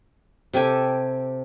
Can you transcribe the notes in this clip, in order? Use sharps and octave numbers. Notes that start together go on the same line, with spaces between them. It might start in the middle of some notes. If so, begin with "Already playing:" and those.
C3 G4 A4 G#5